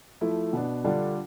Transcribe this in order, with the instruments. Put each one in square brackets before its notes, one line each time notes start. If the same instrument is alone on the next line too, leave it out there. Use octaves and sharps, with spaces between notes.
[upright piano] F3 A3 E4
B2 B3 D4
D3 G3 D4 F4